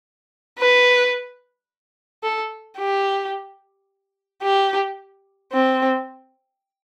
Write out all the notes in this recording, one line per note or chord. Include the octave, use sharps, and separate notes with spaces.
B4
A4
G4
G4
C4